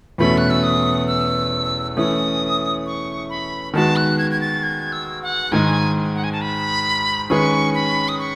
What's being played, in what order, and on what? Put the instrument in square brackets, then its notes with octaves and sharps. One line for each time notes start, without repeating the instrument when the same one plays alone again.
[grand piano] E2 B2 A3 C#4 [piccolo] B5
[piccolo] F#6
E6
D#6
E6
[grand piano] E3 A3 C#4 [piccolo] D#6
[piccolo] C#6
B5
[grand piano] D#3 G#3 B3 F#4 [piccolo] A5
[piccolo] F#6
G#6
G#6
A6
G#6
E6
F#5
[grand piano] G#2 D#3 G#3 [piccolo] G#5
[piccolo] F#5
G#5
A5
B5
[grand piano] D#3 G#3 C#4 G#4 B4 [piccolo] C#6
[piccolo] B5
D#6
C#6